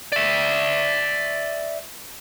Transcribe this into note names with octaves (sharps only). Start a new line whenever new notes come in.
D5 E5